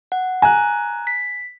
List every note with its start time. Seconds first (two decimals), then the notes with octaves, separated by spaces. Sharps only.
0.12 F#5
0.42 G#5 A#5 F#6
1.07 B6